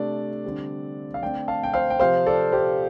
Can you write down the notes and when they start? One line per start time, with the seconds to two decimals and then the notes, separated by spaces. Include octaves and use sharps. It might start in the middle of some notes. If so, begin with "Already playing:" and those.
Already playing: C3 A3 D4 D5
0.44 D3 G3 C4
1.14 F5
1.22 D3 A3 C4 D5 G5
1.48 F5 A5
1.63 G5
1.74 C5 F5
1.90 G5
2.00 C3 F3 C4 C5 F5
2.26 A4 D5
2.52 G4 C5